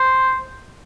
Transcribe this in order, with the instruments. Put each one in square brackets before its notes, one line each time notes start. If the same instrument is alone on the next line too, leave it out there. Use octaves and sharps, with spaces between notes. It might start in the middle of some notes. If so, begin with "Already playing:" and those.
Already playing: [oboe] C5